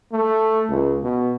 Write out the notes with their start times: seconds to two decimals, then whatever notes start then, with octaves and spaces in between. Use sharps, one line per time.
0.12 A3
0.69 C#2
1.03 B2